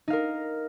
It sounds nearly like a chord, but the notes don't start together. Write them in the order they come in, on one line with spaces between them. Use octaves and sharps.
D#4 F5 A#4